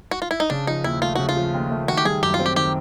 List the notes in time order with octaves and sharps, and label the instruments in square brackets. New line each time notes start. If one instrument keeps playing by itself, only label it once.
[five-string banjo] F#4
F4
E4
D#4
[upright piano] C#3 [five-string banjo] D4
[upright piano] F3 [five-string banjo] D#4
[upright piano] D#2 [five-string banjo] E4
[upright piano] A3 [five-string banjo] F4
[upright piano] C#3 [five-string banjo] F#4
[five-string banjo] F4
[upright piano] F3
D#2
A3
[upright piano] D#3 [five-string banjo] F#4
[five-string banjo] G4
[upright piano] G3 [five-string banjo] G#4
[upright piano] F#2 [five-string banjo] G4
[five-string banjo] F4
[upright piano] C4
[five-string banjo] G4
[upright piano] D#3 [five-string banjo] G4